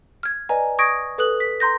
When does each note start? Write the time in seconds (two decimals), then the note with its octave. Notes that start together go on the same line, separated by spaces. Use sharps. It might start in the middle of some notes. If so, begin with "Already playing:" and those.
0.23 F6 G#6
0.49 B4 D5 D#5 G#5 A#5
0.79 C#6 D#6 G#6 A#6 D7
1.18 A4 B4 D#6 F#6 F#7
1.40 B6
1.60 A#5 C6 G6 A#6